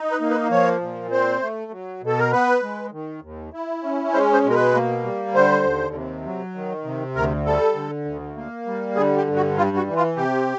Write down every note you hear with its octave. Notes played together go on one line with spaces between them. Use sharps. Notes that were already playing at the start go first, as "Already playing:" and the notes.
Already playing: D#4
B4
A#3
B4
F3 C#5
A#2
C4 C5
A3
F#3
B2 A4
A#4
B3 B4
G#3
D#3
D#2
E4
C#4
G#3 C5
C5
B2
A#4
B4
A#3
G3
D3 C5
D#2
C3
F#3
D#3
C3
D2 A#4
G3 A4
D3
D2
A#3
G3
D3 G#4
G4
G2
F#4
G3 F4
F#4
E3
F4
C3 G4